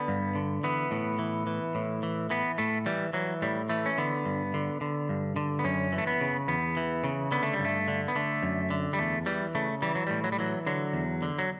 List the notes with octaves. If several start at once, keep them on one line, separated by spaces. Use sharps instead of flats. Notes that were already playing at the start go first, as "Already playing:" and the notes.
Already playing: D3 B3
G2
D3
E3 B3
A2
E3
E3
A2
E3
E3 B3
A2 A3
E3 G3
E3 F#3
A2 G3
E3 A3
C#4
D3 B3
G2
D3
D3
G2
D3
B3
F#2 C#4
E3
A3
B3
C#3
E2 B3
E3
C#3
D3 B3
A3
G3
G2
A3
D3
B3
D3 A3
F#2
D3
G3
E2 A3
E3 G3
C#3 A3
E3 G3
F#3
A2 G3
F#3
G3
E3 F#3
D3 F#3
E2
D3
F#3